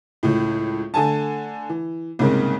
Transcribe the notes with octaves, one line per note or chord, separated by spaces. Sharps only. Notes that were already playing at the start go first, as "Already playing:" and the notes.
C#2 A2
D3 A3 G#5 A5
E3
C2 G#2 C#3 A#3 C4